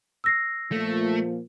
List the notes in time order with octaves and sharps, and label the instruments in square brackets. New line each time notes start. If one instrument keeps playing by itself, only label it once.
[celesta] E6 A#6 C7
[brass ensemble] A#2 F3 [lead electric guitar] A3